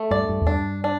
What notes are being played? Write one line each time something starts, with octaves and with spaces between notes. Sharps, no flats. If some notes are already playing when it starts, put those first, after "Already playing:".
Already playing: A3
G2 D5
G2
E2
G2 D4
D4